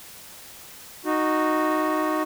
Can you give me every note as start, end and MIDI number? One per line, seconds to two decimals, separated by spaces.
1.05 2.23 63
1.05 2.23 66